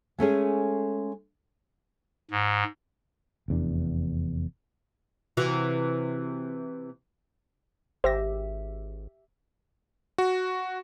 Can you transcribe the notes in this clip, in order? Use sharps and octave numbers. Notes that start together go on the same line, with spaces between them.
G#3 A3 C#4 G#4
G#2
F1 E2 D4
C3 E3 F#4
G#1 G4 C5 E5 A#6
F#4